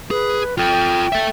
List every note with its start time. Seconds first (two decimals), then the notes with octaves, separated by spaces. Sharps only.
0.11 G#4 B4
0.58 F4 A4 G5
1.12 A4 E5